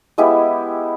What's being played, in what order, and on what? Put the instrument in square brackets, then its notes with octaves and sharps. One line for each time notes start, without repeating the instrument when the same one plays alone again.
[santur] G#3 B3 E4 G4